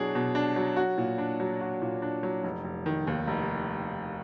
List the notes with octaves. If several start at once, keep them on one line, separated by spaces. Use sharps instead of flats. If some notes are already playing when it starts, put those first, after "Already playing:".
Already playing: B2 F#3 D4 G#4
B2
D4
F#3
F#4
A#2
D4
F#3
F#4
A#2
D4
F#3
F1
F1
D#3
D#2
F1